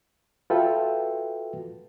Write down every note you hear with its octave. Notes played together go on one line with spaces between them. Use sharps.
F4 F#4 A4 B4 E5 G5